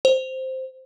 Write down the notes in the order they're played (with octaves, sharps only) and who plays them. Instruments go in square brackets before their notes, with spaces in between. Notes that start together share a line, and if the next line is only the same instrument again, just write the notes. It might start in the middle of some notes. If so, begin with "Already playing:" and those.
[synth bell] C5